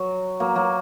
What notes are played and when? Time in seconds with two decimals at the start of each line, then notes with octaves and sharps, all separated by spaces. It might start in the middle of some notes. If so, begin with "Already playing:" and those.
Already playing: F#3
0.40 F#3 A#3
0.55 F#3 A#3